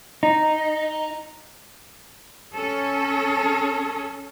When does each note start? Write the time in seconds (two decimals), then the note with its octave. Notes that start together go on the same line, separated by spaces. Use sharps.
0.23 D#4
2.52 C#4 A4